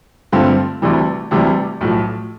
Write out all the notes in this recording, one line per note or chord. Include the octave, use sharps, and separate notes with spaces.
G2 D3 A3 C4 F4
D2 C3 E3 G3
D2 C3 E3 G3
B1 A2 F3